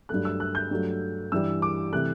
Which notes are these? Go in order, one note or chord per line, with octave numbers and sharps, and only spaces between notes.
G2 F#3 A3 F#6
E6
F#6
G6
G2 F#3 A3
G2 E3 G3 E6
D6
C3 E3 A3 F#6